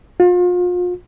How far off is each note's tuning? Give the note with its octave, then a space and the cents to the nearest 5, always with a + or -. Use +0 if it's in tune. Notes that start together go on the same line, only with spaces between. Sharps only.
F4 +35